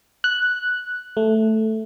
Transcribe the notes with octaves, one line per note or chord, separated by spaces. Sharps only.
F#6
A3